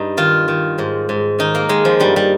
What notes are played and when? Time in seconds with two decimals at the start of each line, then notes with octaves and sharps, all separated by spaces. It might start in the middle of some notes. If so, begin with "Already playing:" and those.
Already playing: G2 D#4
0.17 D#3 F4
0.48 D#3
0.78 G#2
1.09 G#2
1.39 D#3 D#4
1.55 A#3
1.69 D#3 G#3
1.85 F3
2.00 G2 G3
2.16 G3